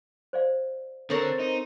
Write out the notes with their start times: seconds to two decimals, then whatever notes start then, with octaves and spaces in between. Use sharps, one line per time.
0.33 C5 D5 F5
1.10 D3 C4 A4 A#4 C#5 C#6
1.39 D#4